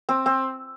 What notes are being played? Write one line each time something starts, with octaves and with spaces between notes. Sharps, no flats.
C4
C4